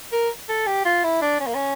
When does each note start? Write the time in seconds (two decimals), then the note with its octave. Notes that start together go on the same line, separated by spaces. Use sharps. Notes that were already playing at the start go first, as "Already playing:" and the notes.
0.12 A#4
0.49 A4
0.66 G4
0.85 F4
1.03 E4
1.21 D4
1.40 C#4
1.46 A#3
1.55 C#4